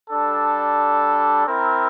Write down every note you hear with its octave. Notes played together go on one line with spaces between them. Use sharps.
G3 D4 A4
C4 E4 A#4